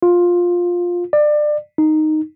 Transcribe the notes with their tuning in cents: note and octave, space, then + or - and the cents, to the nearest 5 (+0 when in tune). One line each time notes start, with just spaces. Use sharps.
F4 +10
D5 +25
D#4 -5